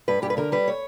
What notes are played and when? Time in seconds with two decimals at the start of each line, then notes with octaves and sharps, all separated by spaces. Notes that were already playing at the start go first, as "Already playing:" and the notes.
0.08 G2 B4
0.22 G2 G4
0.30 B4
0.37 D3 A#4
0.52 G3 B4
0.68 C#5